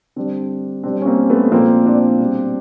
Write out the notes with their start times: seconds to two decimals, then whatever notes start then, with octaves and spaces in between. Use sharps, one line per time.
0.16 D3 G3 C4 D4
0.83 B2 G3 C4 D4
1.02 C#4
1.06 A#3 C4
1.30 A3 B3
1.51 A#2 F3 G#3 A#3 C4
1.85 C4 D4
2.19 B2 G3